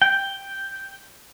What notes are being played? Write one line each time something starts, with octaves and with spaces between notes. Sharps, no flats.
G5